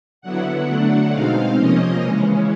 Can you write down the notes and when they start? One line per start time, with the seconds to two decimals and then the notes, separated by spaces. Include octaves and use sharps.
0.22 D3 F#3 B3 E4 F#5
0.66 D3 F#3 A3 D4 F#5
1.11 B2 G#3 C4 D#4 F5
1.56 C3 F3 A#3 C#4 D#5
2.01 C#3 E3 G#3 C#4